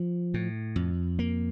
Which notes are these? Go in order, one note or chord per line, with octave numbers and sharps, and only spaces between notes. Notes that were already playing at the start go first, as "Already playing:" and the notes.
Already playing: F3
A2
F2
A#3